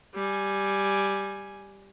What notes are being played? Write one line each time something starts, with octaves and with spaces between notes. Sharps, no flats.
G3 G#5